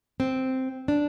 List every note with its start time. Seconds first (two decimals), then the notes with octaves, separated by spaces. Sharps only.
0.20 C4
0.88 D4